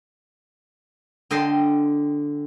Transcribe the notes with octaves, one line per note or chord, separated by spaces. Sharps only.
D3 D#5 G5 A5 C6